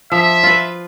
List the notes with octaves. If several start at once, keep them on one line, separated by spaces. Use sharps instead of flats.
F3 E5
F4 B4